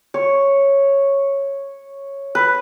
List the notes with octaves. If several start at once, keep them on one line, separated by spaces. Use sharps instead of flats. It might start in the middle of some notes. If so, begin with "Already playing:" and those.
C#5
B4